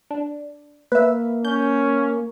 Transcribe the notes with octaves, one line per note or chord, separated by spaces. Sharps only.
D4
A#3 B4 E5
C#4 G6